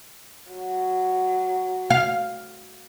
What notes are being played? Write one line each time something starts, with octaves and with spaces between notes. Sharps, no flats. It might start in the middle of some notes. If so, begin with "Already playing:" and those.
F#3
F5